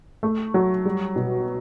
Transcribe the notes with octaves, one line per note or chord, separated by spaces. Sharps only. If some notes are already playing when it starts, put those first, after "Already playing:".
A3
F#3
G3
B2